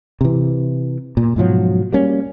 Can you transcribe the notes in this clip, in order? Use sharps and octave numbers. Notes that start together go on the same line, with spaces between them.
C3 E3
A#2
G#2 B2 F3 F#3
G3 A#3 C#4